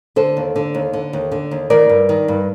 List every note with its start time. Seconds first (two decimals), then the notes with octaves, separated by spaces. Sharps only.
0.16 D3 A4 C5
0.37 D#2
0.56 D3
0.75 D#2
0.93 D3
1.13 D#2
1.32 D3
1.51 D#2
1.70 D#3 A#4 D5
1.89 G2
2.09 D#3
2.28 G2